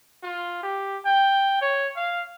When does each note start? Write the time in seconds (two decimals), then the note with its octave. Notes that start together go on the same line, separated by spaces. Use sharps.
0.23 F4
0.63 G4
1.05 G5
1.61 C#5
1.96 F5